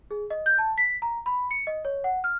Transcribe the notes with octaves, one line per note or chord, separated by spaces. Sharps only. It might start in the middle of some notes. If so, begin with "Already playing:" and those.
G#4
D#5
G6
A5
B6
A#5
B5
C#7
D#5
C#5
F#5
F6